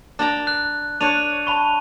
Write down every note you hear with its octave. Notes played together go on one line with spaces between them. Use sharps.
D4 G5 A#5
F#6
D4 C#5 D#7 F7
A5 B5 C#6